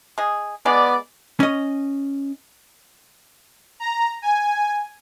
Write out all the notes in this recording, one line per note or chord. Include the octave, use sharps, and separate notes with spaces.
G#3 G#4
G#3 B3 D5
C#4 D#5
A#5
G#5